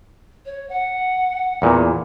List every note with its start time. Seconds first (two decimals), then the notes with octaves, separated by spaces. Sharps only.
0.45 C#5
0.69 F#5
1.62 E2 A#2